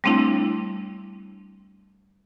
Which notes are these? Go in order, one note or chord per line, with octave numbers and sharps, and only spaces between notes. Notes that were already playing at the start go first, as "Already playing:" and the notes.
G3 A3 C4 D4 E4